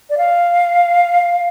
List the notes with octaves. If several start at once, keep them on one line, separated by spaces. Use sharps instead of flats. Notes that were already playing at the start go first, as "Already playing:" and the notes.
D5
F5